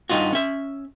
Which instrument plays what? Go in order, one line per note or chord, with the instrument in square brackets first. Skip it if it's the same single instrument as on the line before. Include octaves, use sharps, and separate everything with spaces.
[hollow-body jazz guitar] G2 D#4 F4 F#4
C#4 E5